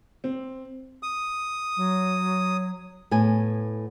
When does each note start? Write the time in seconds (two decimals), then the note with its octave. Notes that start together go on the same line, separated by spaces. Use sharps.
0.24 C4
1.03 D#6
1.77 F#3
3.11 A2 B3 G#5